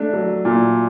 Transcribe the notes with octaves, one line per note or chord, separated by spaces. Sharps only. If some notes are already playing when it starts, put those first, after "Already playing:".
Already playing: A3 D4
F#3
A#2